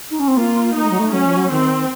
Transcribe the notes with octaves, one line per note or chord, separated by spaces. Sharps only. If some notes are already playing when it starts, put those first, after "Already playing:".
D#4
C#4
C4
A#3 F4
A#3 D#4
A3
F#3
A3
F#3 C#4
F3
F#3
D#3 C4